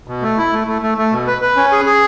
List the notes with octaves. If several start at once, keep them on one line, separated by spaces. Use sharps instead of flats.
B2
A3
E4
A3
A3
A3
A3
B2
B4
B4
C#4
G#4
G#4